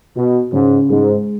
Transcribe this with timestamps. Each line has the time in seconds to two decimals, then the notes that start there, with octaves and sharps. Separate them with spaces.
0.16 B2 F#4
0.53 G#2 C#3
0.90 G#2 G#3